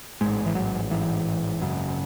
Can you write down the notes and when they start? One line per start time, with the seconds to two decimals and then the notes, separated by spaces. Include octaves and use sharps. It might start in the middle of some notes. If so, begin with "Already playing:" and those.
0.21 A1 G#2 G#3
0.46 E3
0.55 F#3
0.90 A1 G#2 E3
1.60 G#1 F#2 C#3